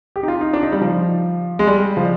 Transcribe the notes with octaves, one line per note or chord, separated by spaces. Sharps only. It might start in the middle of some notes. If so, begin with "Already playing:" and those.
G4
D#4
F4
D#4
D4
D#4
G3
F3
G#3
G3
F3